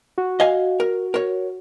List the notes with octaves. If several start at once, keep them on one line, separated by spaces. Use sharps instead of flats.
F#4
D#5 F5 G#5
A#4
A#4 C#5